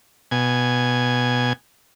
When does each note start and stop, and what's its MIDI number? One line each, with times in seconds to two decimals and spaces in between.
0.31 1.53 47
0.31 1.53 80